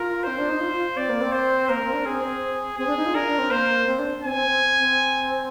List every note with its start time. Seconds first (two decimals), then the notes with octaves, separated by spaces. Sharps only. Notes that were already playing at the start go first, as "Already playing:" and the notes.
Already playing: F4 A#4
0.23 C4 C5
0.38 D4
0.49 D#4
0.61 F4
0.72 F4
0.96 C4 D5
1.09 A#3
1.21 C4
1.32 C5
1.69 A#3 A#4
1.82 C4
1.93 D4
2.05 C4 G#4
2.24 C4
2.78 C4 G#4
2.87 D4
2.97 D#4
3.06 F4
3.15 D4 A#4
3.27 D4
3.39 C4
3.51 A#3 C5
3.87 C4
3.99 D4
4.23 C4 G#5
4.35 C4
4.47 C4
4.78 C4